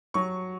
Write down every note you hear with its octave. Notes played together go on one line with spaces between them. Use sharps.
F#3 C#6